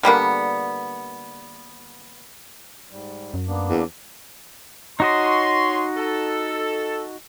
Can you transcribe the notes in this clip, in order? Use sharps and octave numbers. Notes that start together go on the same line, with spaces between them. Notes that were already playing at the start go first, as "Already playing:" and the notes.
D3 G3 A#3 B3
G#2 G3
F#2
A#3 B3 D4
E2
D#4 F#4 C#5 D#5 C6
A4